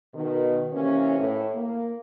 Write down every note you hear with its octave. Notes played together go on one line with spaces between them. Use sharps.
B2 D#3
C3 E3 A#3 C#4
A2
A#3